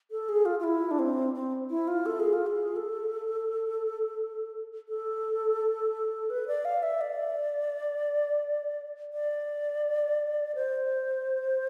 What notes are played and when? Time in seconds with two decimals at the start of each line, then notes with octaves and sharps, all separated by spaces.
0.11 A4
0.29 G#4
0.45 F4
0.59 F4
0.64 E4
0.91 D4
0.99 C4
1.34 C4
1.70 E4
1.88 F4
2.06 A4
2.20 G#4
2.33 F4
2.46 G#4
2.76 A4
4.89 A4
6.30 B4
6.48 D5
6.65 F5
6.83 E5
7.01 D5
9.13 D5
10.55 C5